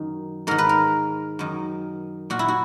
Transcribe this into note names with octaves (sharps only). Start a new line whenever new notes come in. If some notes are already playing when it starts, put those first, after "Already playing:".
Already playing: F#2 D#3
G#2 D#3 A#4
B4
A#4
F#2 D#3
A#2 F#4
E4
F#4